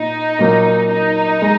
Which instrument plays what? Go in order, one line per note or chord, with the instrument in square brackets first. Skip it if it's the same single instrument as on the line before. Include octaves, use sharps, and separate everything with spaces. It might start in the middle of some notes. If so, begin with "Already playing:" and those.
Already playing: [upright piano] A#2 [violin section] D#4
[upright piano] A#2 F#3 A#3
[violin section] D#4
[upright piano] G#3